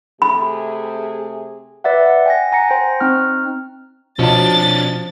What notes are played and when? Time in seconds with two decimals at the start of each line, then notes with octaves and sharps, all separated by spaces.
0.22 C3 A3 G#4 B5
1.84 B4 D5 E5 F#5
2.06 F#5
2.26 G5 G#5 A#6
2.52 F#5 G#5 A#5 A#6 C#7
2.69 C5 G5 A#6
3.00 C4 D#4 F6
4.19 B2 F3 C#4 D4 A5 A6